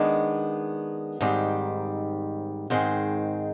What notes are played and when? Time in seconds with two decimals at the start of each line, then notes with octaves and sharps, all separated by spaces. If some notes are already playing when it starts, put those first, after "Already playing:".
Already playing: D#3 G#3 B3 D4
1.21 G#2 D#3 G3 C4
2.70 G#2 D#3 G#3 C4